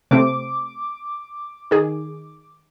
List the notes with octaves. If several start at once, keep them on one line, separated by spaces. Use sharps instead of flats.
C3 A3 C4 D6
D#3 G#4